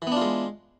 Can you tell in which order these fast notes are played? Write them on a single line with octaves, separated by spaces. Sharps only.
E3 B3 D4 F4 G#3